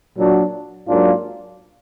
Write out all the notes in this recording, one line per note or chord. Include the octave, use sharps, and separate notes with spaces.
A#2 F#3 D4 F#4
G#2 F#3 A#3 D4 F4